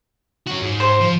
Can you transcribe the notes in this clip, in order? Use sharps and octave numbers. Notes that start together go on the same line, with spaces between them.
C#4 F#4
G#2
C5
F3